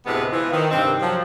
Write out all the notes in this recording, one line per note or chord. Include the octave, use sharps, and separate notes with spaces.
D2 A2 C3 G#3 B3 B4
E3 F3
D#3
G2 C3 C4
F3 F#3